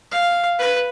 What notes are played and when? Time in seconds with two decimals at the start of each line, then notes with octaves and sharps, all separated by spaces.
0.12 F5
0.59 B4